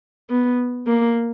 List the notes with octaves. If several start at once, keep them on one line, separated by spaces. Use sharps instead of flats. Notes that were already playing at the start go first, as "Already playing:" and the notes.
B3
A#3